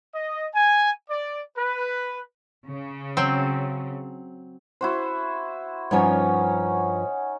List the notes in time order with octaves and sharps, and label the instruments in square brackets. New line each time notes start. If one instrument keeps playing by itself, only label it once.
[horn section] D#5
G#5
D5
B4
[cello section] C#3
[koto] F#3 C4
[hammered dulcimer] E4 F#4 C5
[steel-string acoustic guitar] G2 F3 [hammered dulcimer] C#4 D#4 C#5 [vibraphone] F#5 G#5